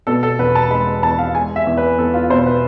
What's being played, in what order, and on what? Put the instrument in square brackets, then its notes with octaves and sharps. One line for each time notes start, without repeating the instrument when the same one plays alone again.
[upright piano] B2 A4
A4
E1 B4
A5
G#3 B5
E2 A5
F5
G#3 G#5
E5
E2
B4
E2 A4
F4
B2 C5
B4